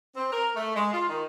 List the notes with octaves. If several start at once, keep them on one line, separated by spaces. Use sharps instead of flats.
C4
A#4
A3
G#3
F4
D#3